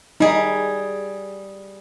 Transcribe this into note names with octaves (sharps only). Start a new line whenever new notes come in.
G3 D#4 G#4